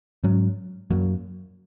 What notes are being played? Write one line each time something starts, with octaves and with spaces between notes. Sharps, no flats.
G#2 F#3 C#4
F#2 F#3 A#3